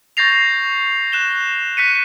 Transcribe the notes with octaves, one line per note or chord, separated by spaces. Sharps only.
C#6 G6 A6 A#6 C7 F7
F#6 E7 G7
F#6 B6 C#7 D#7